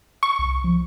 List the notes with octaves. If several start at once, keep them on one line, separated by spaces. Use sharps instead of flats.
C#6
C2
F3